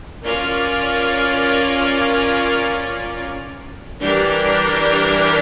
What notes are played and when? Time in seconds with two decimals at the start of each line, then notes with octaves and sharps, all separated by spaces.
0.24 C#4 F4 A#4 D5
4.00 E3 G3 D4 G4 A#4